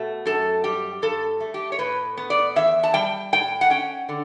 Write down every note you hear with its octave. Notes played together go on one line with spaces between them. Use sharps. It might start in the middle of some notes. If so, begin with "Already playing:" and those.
Already playing: B2 A3
F#2 A4
G3 G4
G2 A4
A3
G4
C#5
A2 B4
B3
D5
E2 E5
A5
G3 G5
A2 G5
F#5
C#4 G5
D3